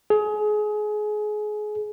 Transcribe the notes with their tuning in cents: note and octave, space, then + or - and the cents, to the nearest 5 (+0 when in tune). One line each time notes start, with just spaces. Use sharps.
G#4 +25